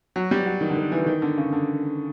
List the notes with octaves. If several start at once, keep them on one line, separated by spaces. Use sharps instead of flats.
F#3
G3
F#3
D#3
D3
D#3
E3
D#3
D3
C#3
D3